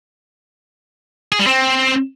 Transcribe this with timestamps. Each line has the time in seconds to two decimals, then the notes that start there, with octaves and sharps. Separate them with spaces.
1.32 G#4
1.39 G3
1.47 C4